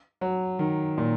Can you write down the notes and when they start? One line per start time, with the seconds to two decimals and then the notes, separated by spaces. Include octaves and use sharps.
0.21 F#3
0.59 D#3
0.98 A#2